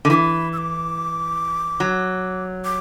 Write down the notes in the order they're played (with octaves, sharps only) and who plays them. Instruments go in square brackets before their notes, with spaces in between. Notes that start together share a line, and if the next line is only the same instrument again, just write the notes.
[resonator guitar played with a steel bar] D3
[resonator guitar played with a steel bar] E3 [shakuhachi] D6
[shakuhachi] B5
E6
D6
[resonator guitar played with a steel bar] F#3
[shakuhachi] D6